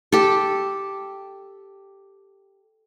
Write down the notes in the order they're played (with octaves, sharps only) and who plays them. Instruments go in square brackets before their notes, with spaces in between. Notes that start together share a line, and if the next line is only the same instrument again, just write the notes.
[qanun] G4 A4